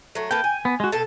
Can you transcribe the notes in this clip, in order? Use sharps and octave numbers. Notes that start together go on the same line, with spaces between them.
F#3 A3
A#3 A4 B4 G5
G#5
B3
G#3 F#4
B2 A4 A5